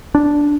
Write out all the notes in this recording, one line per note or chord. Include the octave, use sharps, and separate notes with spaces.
D4